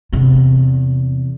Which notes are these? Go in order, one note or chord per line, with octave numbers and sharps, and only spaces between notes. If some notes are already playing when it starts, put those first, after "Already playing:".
E2 C3